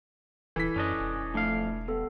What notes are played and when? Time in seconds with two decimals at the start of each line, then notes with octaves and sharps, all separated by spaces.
0.56 D#1 E3 A4 B6
0.76 F#2 C#4 D4 D#5
1.00 E1
1.34 F2 A3 D4 F5
1.88 G2 B3 A4